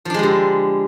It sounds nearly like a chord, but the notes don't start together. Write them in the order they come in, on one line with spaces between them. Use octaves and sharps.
F3 D4 G#3 G3 D3